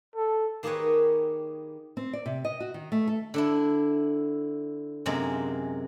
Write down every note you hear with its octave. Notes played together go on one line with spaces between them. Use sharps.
A4
D#3 A#3 G4 G#4 B4 C#5
C4
D5
C3
D#5
F#4
D#3
A3
A4
D3 D4 E4
F#2 C3 G#3 A#3